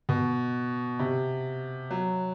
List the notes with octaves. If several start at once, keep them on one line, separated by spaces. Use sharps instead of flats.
B2
C3
F#3